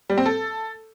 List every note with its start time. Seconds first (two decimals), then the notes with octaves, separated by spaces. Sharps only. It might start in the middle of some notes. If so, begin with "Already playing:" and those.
0.10 G3
0.18 C4
0.26 A4